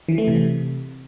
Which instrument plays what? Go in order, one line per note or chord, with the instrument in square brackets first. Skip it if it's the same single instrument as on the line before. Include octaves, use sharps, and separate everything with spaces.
[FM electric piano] E3
A3
C3